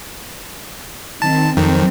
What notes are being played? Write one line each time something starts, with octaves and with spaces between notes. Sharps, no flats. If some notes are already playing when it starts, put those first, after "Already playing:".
D#3 C4 A5
F2 D#3 F#3 C4